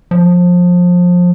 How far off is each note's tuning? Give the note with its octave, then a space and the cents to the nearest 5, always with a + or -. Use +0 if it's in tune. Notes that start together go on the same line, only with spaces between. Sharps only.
F3 +25